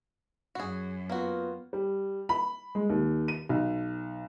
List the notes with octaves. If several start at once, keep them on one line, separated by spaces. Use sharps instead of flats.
F#2 F#4 G#4
A#3 B3 F4 F#4
G3
B5
G#3
D#2
D#7
B1